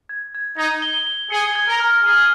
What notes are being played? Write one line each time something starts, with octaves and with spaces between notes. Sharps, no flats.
G#6
G#6
D#4 G#6
G7
G7
G#4 C#7
G#6
A#4
F6
G#4 F6